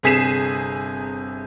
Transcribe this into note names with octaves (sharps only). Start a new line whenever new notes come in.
G1 C3 G#4 B6 C7 E7